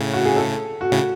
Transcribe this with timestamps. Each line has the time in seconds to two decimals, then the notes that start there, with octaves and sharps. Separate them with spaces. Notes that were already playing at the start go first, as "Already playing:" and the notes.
Already playing: A2 C#3
0.13 F#4
0.25 G#4
0.36 A4
0.81 F#4
0.92 A2 C#3